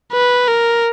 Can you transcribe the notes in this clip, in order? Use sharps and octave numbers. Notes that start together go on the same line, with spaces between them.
B4
A#4